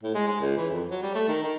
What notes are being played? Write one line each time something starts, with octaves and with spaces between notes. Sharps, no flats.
A2
G#3
G#3
C#2
E3
F2
F#3
G3
A3
D#3
D#3